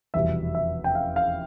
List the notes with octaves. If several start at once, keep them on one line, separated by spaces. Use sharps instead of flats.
F1 E2 B2 G3 E5
E5
G5
F5
F5